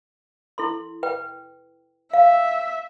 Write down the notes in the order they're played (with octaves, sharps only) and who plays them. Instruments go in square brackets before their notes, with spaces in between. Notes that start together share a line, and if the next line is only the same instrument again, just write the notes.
[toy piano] E4 A4 C6
B4 G5
[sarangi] E5 [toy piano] F5